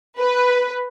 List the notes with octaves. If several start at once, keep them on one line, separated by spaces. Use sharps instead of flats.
B4